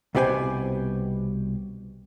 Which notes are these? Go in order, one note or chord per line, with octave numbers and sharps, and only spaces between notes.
C2 B2 B3 G4 C5 G#5